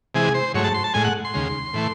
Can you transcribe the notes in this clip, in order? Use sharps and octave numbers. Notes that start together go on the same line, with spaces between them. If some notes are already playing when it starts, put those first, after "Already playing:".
C3 E3 G#3 G#4
C5
G#2 F#3 A3 C#5
A5
C6
A5
A2 G#3 G#5
F#5
C6
D#2 C#3 G#3
A2 E3 A3